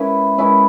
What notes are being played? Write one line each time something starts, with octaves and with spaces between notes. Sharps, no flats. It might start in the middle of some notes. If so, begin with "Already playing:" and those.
Already playing: G#3 C#4 E4 B4
G#3 C#4 E4 B4